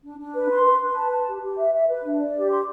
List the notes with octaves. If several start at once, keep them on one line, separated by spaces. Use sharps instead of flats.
D4
D4
B4
C6
B4
B4
A5
A5
G4
G4
E5
E5
B4
D4
D5
G4
C6